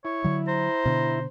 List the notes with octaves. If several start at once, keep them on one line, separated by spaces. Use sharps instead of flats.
E4 C#5
D3 F#3
C5 A#5
B2 D3